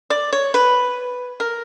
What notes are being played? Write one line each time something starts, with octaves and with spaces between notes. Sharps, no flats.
D5
C#5
B4
A#4